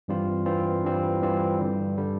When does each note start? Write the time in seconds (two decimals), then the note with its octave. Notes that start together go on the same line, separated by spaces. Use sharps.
0.08 G2 E3 G3 C4 F4
0.46 G2 E3 G3 C4 F4
0.84 G2 E3 G3 C4 F4
1.22 G2 E3 G3 C4 F4
1.60 G2 D3 G3
1.98 D3 G3